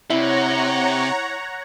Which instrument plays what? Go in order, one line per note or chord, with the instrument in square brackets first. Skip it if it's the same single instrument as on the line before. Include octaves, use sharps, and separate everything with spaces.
[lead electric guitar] C3 [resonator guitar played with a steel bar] E4 [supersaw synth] C#5 F#5 A#5